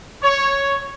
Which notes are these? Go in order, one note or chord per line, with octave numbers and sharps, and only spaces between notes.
C#5